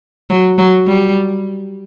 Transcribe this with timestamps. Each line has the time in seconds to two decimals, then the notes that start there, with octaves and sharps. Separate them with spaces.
0.30 F#3
0.58 F#3
0.87 G3